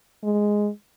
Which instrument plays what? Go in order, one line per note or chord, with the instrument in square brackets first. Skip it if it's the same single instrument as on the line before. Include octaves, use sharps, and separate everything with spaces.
[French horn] G#3